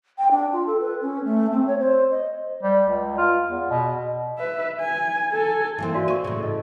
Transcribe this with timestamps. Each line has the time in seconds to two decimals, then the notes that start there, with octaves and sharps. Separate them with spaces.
0.18 G5
0.31 D4
0.52 F4
0.67 A4
0.80 B4
1.01 C#4
1.25 A3
1.52 C4
1.68 C#5
1.79 C5
2.11 D#5
2.63 G3
2.88 C#2
3.18 F4
3.47 E2
3.70 B2
4.38 B4 E5
4.80 G#5
5.32 A4 G#5
5.78 E3 A#3 C4
5.94 F#4 D5 F5
6.08 C4 A#4 C#6
6.24 A2 C#3
6.43 D#5